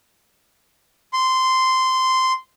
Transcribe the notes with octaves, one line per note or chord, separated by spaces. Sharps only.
C6